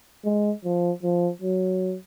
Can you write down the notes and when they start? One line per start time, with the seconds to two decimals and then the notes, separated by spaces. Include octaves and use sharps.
0.25 G#3
0.64 F3
1.03 F3
1.42 F#3